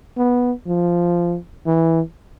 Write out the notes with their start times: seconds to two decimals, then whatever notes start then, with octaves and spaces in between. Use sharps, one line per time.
0.17 B3
0.67 F3
1.66 E3